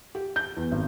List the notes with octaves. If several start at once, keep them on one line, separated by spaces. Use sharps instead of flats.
G4
G6
E2
G#1